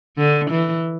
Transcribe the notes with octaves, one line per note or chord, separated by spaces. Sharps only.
D3
E3